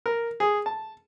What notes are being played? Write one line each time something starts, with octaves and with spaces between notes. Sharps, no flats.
A#4
G#4
A5